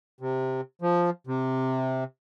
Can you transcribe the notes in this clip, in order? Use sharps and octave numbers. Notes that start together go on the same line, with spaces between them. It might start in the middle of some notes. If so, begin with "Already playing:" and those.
C3
F3
C3